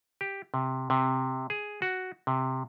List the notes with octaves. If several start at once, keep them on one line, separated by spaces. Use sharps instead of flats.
G4
C3
C3
G#4
F#4
C3